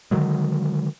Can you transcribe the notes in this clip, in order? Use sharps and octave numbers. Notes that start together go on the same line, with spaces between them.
D3 D#3 F#3 G#3